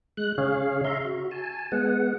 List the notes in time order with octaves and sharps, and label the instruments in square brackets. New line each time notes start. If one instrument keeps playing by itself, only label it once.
[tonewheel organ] G#3 F#6
C#3 G#4 C#5 F5
E5 A#5 C6
F#4
G#5 A5
G#3 B3 F#5